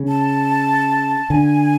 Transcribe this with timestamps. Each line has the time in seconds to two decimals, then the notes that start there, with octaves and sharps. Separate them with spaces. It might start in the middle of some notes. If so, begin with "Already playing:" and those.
Already playing: C#3
0.08 A5
1.30 D3 G#5